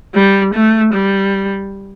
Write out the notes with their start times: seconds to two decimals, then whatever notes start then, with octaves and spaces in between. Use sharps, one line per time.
0.15 G3
0.54 A3
0.93 G3